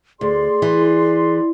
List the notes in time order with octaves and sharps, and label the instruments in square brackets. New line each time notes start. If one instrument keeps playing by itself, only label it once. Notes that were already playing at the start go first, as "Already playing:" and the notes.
[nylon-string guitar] D2 [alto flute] G#4 [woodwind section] D5 C6
[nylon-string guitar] E3